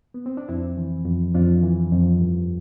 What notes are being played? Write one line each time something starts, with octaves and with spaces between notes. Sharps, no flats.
B3
C4
D4
F2 C4 E4
E3
F2
F2 D4 F4
E3
F2
G2